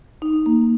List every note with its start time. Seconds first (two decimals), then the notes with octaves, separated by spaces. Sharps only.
0.22 D#4
0.46 A#3